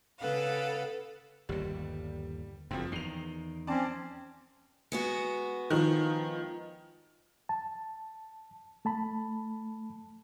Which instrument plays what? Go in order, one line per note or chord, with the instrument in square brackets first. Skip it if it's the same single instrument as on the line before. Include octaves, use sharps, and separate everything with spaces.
[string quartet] C#3 A4 B4 F5 F#5
[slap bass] G1 D#2 [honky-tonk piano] G3
[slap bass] F#1 F#2 [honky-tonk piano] F3 C4
[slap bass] E2 D#3 [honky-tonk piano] C7 F7
[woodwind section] F3 C4 C#4 [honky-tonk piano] D5 A5
[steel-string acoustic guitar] G#3 B3 F#4
[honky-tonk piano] D#3 F3
[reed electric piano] A5
A3 A5 B5